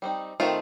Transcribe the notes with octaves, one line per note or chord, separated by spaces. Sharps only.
G3 C4 D#4
D#3 A3 C4 D#4 F4